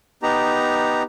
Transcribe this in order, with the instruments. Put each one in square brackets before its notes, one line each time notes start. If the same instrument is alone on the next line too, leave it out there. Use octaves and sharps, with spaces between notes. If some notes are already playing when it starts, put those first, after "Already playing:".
[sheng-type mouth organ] B3 D#4 G4 A#5